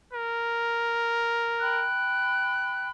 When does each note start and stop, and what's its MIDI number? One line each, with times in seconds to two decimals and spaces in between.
0.13 1.86 70
1.60 2.89 79
1.60 2.89 83
1.60 2.89 90